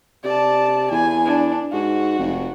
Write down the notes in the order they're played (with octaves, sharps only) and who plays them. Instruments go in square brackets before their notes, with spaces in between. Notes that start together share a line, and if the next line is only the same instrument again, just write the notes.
[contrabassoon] C3 [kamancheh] D5 A5
[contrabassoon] E2 [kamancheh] G#5
[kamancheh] D4
[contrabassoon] G#2 [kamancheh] F#4
[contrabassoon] F1